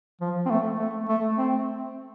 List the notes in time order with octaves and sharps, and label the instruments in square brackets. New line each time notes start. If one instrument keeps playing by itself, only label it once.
[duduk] F3
C4
A3
A3
A3
C4